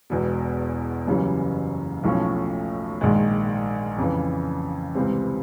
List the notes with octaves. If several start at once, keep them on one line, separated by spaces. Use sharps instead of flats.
E1 E2 B2
F#1 F#2 C#3 E3 G3
B1 A2 F3 A3 C#4
A#1 G#2 D#3 G#3
F2 C#3 E3
C#2 C3 E3 G3 C4